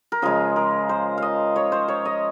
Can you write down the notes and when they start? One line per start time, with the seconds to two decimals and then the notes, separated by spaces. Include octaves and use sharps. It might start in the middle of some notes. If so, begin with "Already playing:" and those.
0.12 A#4
0.22 C#3 F3 G#3 G#4
0.56 A#4
0.89 C5
1.18 D#5 F5
1.56 C#5
1.72 C5
1.88 C#5
2.05 D#5